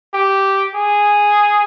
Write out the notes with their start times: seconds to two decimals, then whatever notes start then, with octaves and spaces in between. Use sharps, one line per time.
0.14 G4
0.75 G#4